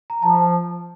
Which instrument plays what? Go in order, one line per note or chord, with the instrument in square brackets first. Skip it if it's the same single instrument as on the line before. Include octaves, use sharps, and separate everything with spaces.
[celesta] A#5
[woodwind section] F3 [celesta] A5